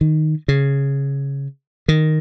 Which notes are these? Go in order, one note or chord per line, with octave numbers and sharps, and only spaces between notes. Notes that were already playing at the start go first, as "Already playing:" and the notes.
D#3
C#3
D#3